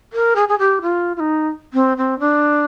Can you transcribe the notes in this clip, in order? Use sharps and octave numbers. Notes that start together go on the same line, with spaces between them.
A#4
G#4
G#4
G4
F4
F4
D#4
C4
C4
D4